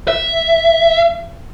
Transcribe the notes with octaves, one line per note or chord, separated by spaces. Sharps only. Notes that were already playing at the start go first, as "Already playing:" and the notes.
E5